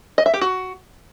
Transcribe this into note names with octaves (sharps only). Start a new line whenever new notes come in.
D#5
E5
G4
F#4